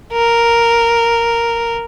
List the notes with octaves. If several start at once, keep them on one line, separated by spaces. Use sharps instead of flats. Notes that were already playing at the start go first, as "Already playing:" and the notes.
A#4